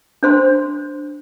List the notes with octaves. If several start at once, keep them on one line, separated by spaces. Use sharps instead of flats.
D4 C5 C6